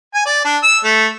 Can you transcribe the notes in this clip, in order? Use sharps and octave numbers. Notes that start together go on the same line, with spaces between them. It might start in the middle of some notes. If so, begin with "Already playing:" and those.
G#5
D5
D4
E6
A3